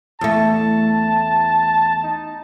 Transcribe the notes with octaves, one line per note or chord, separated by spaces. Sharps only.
E2 A3 A5
D#4